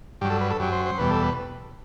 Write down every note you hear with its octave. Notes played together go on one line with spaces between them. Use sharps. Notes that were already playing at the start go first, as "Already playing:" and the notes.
G2 F#3 G4
A4
B4
A4
F#2 F#3 G4
C5
C5
E2 B2 G3 B4
A4
B4